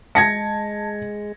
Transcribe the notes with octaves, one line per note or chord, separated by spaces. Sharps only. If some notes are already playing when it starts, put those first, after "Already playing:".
G#3 A5 G#6 A#6 C#7